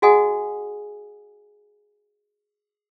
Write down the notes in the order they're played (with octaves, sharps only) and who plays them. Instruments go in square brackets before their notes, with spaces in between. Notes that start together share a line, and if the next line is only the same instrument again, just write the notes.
[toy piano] F#4 G#4 D#5 F#5 G#5 D#6